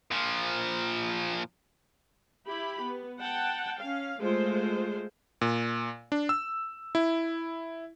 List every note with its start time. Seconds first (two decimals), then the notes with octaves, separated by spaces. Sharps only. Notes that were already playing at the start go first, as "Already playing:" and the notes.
0.11 A#2 F3
2.47 E4 G4 B5
2.81 B3
3.20 F#5 G5 A5
3.80 C#4 F5
4.21 G#3 A3 F4 C5
5.41 A#2
6.12 D4
6.29 E6
6.95 E4